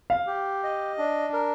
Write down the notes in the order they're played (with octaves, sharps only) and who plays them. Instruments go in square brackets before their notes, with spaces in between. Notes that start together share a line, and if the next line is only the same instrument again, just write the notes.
[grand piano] F5
[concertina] G4
D#5
D4
A#4